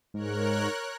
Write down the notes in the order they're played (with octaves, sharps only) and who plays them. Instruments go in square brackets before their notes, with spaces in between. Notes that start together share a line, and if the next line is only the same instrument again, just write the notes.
[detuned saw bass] G#2 [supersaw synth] A#4 C#5 F#6